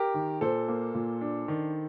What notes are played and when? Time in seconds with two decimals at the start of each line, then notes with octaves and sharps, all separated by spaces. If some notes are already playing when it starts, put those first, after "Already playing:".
Already playing: G4 A#4
0.14 D#3
0.41 A#2 A4 C5
0.68 A#3
0.95 A#2
1.21 D4
1.48 D#3